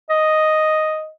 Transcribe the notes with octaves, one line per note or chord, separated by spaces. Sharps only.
D#5